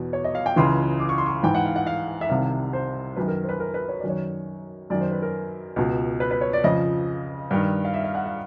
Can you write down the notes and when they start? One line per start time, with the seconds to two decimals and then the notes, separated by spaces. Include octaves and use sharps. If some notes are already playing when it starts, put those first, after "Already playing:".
Already playing: E2 B2
0.13 C#5
0.24 D#5
0.35 F5
0.46 G5
0.56 C#2 C#3 E3 C6
1.00 D6
1.09 C#6
1.18 C6
1.26 C#6
1.43 G#2 E3 G5
1.55 F#5
1.66 F5
1.76 F#5
1.87 F5
2.21 E5
2.29 C2 C3 D#3 F5
2.73 C5
3.16 F#2 D#3 B4
3.28 A#4
3.43 C5
3.49 B4
3.60 A#4
3.74 B4
3.89 C#5
4.00 F#2 D#3 D5
4.10 C#5
4.90 F#2 D#3 D5
5.01 C5
5.12 B4
5.22 A#4
5.76 C#2 B2
6.20 B4
6.31 B4
6.41 C#5
6.53 D5
6.64 F2 C#3 F3 D#5
7.51 G2 D#3
7.85 F5
7.94 E5
8.04 F5
8.15 F#5
8.26 F5